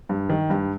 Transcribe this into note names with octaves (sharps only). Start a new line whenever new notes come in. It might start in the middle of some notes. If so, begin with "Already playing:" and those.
G2
D#3
G2